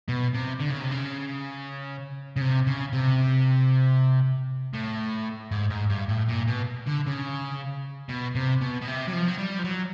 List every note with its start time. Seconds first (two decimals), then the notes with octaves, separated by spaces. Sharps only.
0.09 B2
0.34 C3
0.60 D3
0.71 C#3
0.81 C3
0.91 C#3
2.36 C#3
2.41 C3
2.67 C#3
2.93 C3
4.73 A2
5.52 G#2
5.70 G#2
5.90 G2
6.09 A2
6.29 A#2
6.48 B2
6.86 D3
7.06 C#3
8.09 B2
8.35 C3
8.61 B2
8.81 B2
8.87 C3
9.07 F#3
9.13 F3
9.28 F#3
9.38 G3
9.59 F3
9.64 F#3